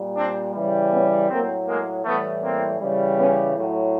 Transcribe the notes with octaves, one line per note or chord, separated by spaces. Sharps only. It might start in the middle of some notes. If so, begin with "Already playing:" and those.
Already playing: A#2 G3
C4 D4
C#3 E3 G3
B3 C#4
A2 F#3 A#3 C4
G#3 A#3
A2 E3 G3 A3 B3
A#3 C4
C#3 E3 G3
B3 C#4
A2 F#3